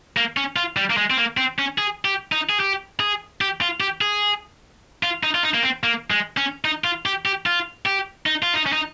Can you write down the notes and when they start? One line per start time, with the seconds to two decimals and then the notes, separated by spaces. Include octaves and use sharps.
0.17 A#3
0.37 C#4
0.56 F4
0.77 G3
0.90 A#3
0.97 G#3
1.10 C4
1.18 A#3
1.37 C4
1.59 C#4
1.78 G#4
2.05 G4
2.32 D#4
2.50 G#4
2.60 G4
3.00 G#4
3.41 G4
3.61 F4
3.80 G4
4.01 G#4
5.03 F4
5.23 D#4
5.35 F4
5.43 D#4
5.54 A#3
5.63 C4
5.83 A#3
6.11 G#3
6.37 C#4
6.65 D#4
6.84 F4
7.06 G4
7.25 G4
7.46 F4
7.86 G4
8.26 D#4
8.43 F4
8.54 D#4
8.66 C#4
8.73 D#4